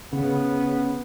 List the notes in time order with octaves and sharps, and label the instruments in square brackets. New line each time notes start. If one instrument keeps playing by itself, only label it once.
[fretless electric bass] C#3 [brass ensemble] B3